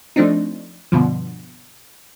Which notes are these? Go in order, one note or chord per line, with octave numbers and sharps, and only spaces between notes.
F3 A3 C4 D4 D#4
G2 B2 D3 F3